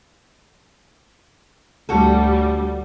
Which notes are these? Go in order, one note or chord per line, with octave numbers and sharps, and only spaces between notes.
D2 A2 G3 F#4 A4